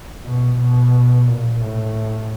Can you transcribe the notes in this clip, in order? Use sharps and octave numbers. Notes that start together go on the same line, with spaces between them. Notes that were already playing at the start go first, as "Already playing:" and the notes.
B2
B2
A#2
A2